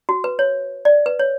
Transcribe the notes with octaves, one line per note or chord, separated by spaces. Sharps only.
F#4
B4
C#5
D5
B4
C#5